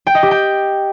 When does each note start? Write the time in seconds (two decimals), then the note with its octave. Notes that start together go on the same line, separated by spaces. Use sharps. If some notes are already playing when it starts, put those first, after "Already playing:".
0.07 G5
0.15 D#5
0.23 G4
0.31 G5